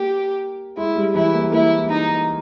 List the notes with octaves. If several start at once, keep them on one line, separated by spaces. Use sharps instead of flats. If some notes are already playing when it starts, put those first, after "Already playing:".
Already playing: A#3 G4
G#3 E4
G3
E3 E4
A#3
A#3 E4
D#4